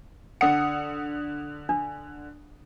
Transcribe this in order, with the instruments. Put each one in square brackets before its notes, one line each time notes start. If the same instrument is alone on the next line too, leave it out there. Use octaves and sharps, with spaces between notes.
[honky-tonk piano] D3 D#6 C#7 [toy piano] F#5
[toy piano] D4